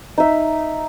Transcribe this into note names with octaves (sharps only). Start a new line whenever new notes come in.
D#4 E5